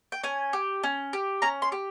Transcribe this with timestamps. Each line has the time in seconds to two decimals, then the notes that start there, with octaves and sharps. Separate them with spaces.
0.12 G5
0.24 C#4 G#5
0.53 G4
0.83 C#4
1.13 G4
1.42 C#4 A#5
1.62 C6
1.72 G4